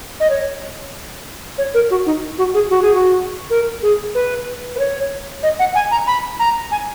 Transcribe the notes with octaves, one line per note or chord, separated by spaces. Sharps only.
D#5
C#5
C#5
A#4
F#4
D#4
F#4
G#4
F#4
G#4
F#4
A#4
G#4
B4
B4
C#5
D#5
F#5
G#5
A#5
B5
A#5
G#5